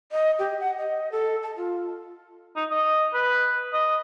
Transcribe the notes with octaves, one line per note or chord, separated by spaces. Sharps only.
D#5
G4
F#5
D#5
A4
A5
F4
D#4
D#5
B4
D#5